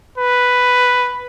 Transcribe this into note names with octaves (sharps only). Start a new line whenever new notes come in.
B4